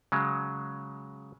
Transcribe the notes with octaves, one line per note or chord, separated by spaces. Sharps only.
C#3 F#3 G#3